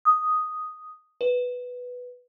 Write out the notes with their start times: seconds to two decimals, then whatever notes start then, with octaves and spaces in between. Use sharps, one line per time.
0.05 D#6
1.21 B4